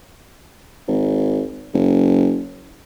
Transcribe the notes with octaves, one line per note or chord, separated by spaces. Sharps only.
G#1
F#1